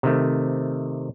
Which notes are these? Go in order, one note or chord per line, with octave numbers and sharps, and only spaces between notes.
C3 D#3 A3